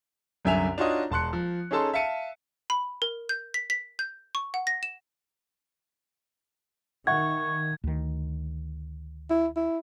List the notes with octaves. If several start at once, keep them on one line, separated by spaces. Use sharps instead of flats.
C2 F#2 D3 E5 G#5 F7
D4 D#4 F4 F#4 C#5 D#5
E1 A5 C6 F#6 C#7
F3
C#4 D#4 G#4 A4 A5 C6
E5 F5 A5 C#7 D#7
B5
A#4
G6
B6
B6
G6
C#6
F#5
A#6
E7
D#3 E5 F#5 C#6 G#6
D2 D#3
E4
E4